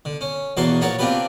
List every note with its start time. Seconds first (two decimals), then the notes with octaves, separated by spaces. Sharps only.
0.05 D3
0.21 C#4
0.57 E2 B2 A#3 F#4 A5 C6
0.81 A#1 F#4 A#4 C#5 A5
0.99 A#3 C4 D4 F4 G4 B4